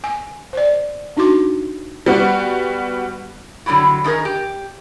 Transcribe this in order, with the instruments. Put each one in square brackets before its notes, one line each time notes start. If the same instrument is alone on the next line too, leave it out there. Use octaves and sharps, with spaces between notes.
[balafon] G#5
C5 D5
D4 D#4 F#4 C6 D6
[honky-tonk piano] G3 B3 F#4
[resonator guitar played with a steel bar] D3 F#3 G3 E4 F#4
D#3 D#4 G#4 A#4
G4